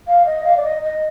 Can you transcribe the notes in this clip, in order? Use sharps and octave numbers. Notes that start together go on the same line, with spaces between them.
F5
D#5
F5
D5
D#5
D#5